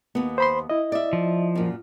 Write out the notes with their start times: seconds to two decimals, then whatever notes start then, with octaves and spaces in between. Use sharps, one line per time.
0.15 D#2 B3
0.38 C5 B5 C6
0.70 E4 D#5
0.92 D5 E5
1.13 F3
1.55 F#2 A#2